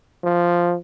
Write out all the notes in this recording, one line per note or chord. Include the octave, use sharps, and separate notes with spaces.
F3